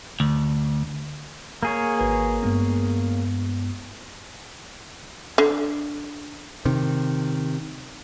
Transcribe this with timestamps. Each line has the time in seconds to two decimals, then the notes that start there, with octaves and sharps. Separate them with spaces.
0.20 D2
1.63 A#3 G#4 C#5
1.98 G#1 B4 G#5
2.43 G2 G#3 B3
5.38 D3
6.65 C3 D#3